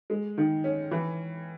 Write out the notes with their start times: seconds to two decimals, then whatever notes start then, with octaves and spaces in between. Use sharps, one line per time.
0.10 G#3
0.38 D#3
0.64 C#4
0.91 E3